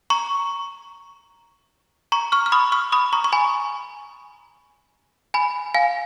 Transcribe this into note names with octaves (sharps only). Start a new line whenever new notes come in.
A#5 C#6
A#5 C#6
C#6 F6
F6
B5 D#6
C#6 F6
B5 D#6
A#5 C#6
C#6
G#5 B5
G#5 B5
F5 G#5